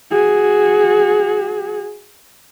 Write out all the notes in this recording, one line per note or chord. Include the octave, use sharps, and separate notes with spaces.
F#4 G#4